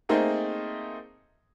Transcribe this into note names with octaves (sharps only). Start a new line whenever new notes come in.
A3 A#3 C4 D#4 G#4 A#4